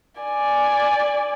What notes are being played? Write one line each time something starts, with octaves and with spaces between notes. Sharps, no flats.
D5 G#5